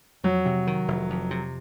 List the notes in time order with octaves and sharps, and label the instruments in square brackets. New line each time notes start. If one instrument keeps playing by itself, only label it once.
[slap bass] F2 [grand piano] F#3
[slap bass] C3
D#3
F1
F2
C3